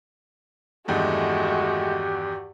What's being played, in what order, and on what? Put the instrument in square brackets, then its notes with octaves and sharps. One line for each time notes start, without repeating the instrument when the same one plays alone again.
[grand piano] E2 G2 D#3 [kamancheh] G#3 A3 [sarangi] F#4 [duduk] G4